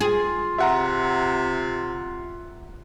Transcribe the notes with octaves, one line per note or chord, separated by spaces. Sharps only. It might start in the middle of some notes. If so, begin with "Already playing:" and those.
F4 G#4
C3 E5 F#5 A#5